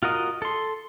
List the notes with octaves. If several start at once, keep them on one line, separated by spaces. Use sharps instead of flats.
F4 F#4 A#4 D#5
A4 C6